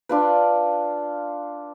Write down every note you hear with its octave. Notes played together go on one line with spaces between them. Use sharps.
D4 F4 B4